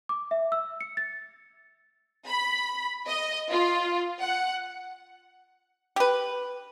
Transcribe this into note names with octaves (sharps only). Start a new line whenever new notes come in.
D6
E5
E6
C#7
A6
B5
D#5
F4
F#5
G4 B4